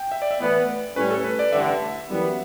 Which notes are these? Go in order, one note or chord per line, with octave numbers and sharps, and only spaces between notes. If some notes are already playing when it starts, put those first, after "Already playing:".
Already playing: G5
E5
D5
E5
A2 E3 B3 D5
A2 G3 C#4 B4
A4
B4
D5
A1 G2 D3 E5
F#2 E3 G3 B3